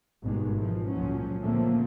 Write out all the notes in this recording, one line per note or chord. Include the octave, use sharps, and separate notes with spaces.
G#1 G2 B2 D#3 G#3
E3 F3
C#2 A#2 F3 F#3 C#4
A#2 D3 F3 A3 A#3 C4